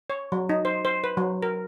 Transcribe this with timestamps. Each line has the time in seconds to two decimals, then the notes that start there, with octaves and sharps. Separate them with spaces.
0.10 C#5
0.32 F#3
0.49 D#4
0.65 C5
0.85 C5
1.04 B4
1.17 F#3
1.42 A#4